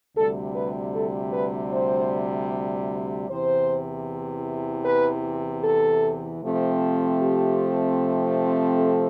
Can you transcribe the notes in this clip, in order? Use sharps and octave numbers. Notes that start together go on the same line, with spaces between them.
D2 C3 G3 A4
B4
A4
B4
C5
E2 C3 E3 C5
B4
A4
C3 F3 A3 C4
G4
A4